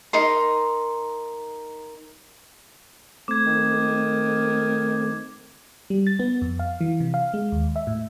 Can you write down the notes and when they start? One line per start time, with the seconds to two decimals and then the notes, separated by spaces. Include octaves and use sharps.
0.13 D#4 A#4 C6
3.28 A3 C4 D6 G#6
3.46 D#3
5.90 G3
6.07 A6
6.19 B3
6.42 F2
6.59 F5
6.81 E3
7.00 C3
7.14 F5
7.34 G#3
7.52 D#2
7.76 E5
7.87 A2